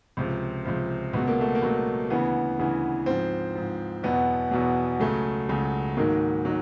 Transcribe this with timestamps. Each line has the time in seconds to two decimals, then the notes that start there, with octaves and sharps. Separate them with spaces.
0.17 C#2 C3 F3
0.65 C#2 C3 F3
1.13 C#2 B2 F#3 B3
1.27 A#3
1.41 A3
1.55 A#3
1.62 C#2 B2 F#3
2.10 D2 C#3 E3 B3
2.59 D2 C#3 E3
3.06 G#2 F3 C4
3.55 G#2 F3
4.03 E2 B2 F#3 B3
4.51 E2 B2 F#3
5.00 C#2 C#3 F#3 A3
5.49 C#2 C#3 F#3
5.97 G#2 D#3 F#3 A#3
6.45 D#3 F#3